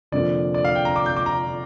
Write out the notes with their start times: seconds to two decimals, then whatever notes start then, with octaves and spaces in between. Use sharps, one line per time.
0.12 F1 F2 D3 F3 A#3 D5
0.54 D5
0.65 F5
0.75 G5
0.85 A#5
0.96 D6
1.06 G6
1.16 D6
1.26 A#5